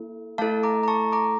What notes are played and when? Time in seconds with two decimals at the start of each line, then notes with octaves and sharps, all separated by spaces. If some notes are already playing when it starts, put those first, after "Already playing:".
Already playing: A#3 E4 A4
0.38 A3 E4 A4 F5 A5
0.63 A#5 D6
0.83 A#5
0.88 A5 C#6
1.12 A#5 D6